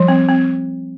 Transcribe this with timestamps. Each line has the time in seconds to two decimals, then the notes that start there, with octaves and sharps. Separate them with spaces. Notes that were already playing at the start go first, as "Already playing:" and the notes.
Already playing: F3 G3
0.08 C4
0.29 C4